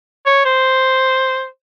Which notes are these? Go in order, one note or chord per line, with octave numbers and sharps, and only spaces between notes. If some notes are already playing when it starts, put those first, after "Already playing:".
C#5
C5